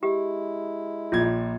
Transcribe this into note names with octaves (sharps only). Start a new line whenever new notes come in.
G#3 E4 G4
A#1 A#2 F4 G#6